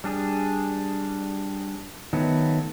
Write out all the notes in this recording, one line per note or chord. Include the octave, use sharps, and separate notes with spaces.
G3 D4 G#4
D#3 F#3 A3 B3